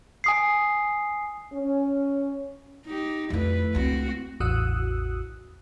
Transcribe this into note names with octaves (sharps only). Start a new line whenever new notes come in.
G#5 D#6 C7
C#4
D#4 G4
F2 D3 A3 E4 B4
C#2 D3 C4 F#4
A1 E2 F#4 D#6 E6 F#6